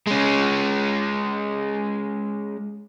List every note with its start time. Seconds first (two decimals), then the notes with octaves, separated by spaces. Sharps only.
0.07 G#3 C#4